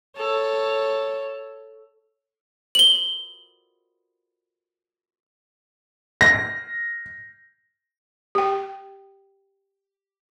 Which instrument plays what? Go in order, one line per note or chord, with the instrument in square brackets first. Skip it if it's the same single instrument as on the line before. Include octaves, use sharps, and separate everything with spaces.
[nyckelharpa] A4 C#5
[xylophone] F#7 G7
[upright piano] A#6
[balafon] G4 G5